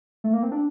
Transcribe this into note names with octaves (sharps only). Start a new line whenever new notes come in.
A3
A#3
C4
D4